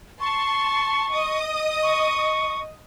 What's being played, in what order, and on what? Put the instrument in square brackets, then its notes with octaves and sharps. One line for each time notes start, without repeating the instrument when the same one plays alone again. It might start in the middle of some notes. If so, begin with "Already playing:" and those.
[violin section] A5 C6 [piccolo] C#6
[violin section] D#5 D#6
[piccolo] C#6